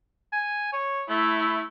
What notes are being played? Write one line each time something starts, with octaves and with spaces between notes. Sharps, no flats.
G#5
C#5
A3 E4